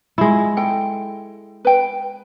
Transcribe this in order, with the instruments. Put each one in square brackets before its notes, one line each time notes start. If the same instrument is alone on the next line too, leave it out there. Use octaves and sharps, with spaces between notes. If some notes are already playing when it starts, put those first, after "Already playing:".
[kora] G#3 E4 [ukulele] F4
[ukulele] A4 G5
B4 G5